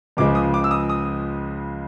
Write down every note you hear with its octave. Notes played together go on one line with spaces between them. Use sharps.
C#2 C#3 F3 G#3 D6
D#6
D6
E6
D#6
D#6